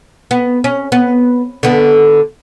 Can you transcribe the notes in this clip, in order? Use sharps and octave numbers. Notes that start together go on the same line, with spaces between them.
B3
C#4
B3
D3 B3